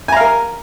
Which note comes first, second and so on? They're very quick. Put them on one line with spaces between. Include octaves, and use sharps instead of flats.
G#5 A#5 F5 A#4